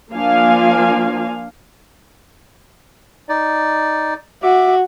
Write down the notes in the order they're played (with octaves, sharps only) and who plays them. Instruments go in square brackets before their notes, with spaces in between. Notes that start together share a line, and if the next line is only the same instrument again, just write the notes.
[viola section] F3 A#3 D4 F5 G#5
[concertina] D#4 D5
[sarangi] F#4 [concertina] E5 D6